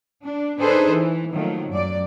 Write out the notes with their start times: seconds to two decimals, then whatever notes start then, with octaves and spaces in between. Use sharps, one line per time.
0.24 D4
0.58 D4 D#4 G#4 A4 B4 C5
0.90 E3
1.32 D#3 F3 F#3 A3 A#3
1.70 F#2 D5